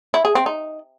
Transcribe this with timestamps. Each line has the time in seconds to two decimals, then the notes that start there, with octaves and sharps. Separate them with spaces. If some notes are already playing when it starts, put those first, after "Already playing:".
0.14 E4
0.25 G#4
0.35 C4
0.46 D#4